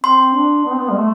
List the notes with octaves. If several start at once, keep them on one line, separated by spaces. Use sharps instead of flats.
C4 C6
D4
B3
C4
B3
G3
A3